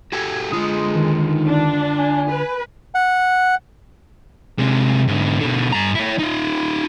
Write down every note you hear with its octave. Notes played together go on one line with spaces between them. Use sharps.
F#4 G4 A4 G#6
D3 G#3 F4 D#6
D#3
D4
G#5
B4
F#5
C3 G#3
G#2 D3
B2 D3
G2 A#5
E4 C#5
D#4 F4